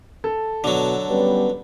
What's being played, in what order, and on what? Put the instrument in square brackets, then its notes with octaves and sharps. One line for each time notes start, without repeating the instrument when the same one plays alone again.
[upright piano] A4
[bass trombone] B2 [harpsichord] D3 F#3
[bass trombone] G3 [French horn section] B3 C#4 B4